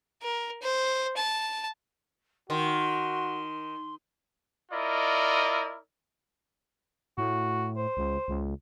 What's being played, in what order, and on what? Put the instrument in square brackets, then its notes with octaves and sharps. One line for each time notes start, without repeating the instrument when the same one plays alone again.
[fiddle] A#4
C5
A5
[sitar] D#3 [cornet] F#4 [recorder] C6
[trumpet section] E4 F4 A#4 D5 D#5
[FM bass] A2 [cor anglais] F#4
[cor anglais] C5
[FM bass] C#2
C#2